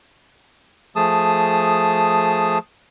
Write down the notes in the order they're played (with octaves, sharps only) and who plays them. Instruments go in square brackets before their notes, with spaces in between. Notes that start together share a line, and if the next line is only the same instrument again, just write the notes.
[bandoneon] F3 A3 G#4 A5 D#6